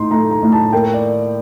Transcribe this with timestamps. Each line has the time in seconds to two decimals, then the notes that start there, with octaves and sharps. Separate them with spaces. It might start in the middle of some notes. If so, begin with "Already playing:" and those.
Already playing: A2 D#4 C6
0.11 A3 A#5
0.31 A#5
0.43 A2
0.52 A5
0.73 A#3 G5
0.94 D5